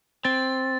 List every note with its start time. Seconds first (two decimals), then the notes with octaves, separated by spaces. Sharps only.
0.25 C4 A6